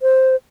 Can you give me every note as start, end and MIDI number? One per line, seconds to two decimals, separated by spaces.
0.02 0.36 72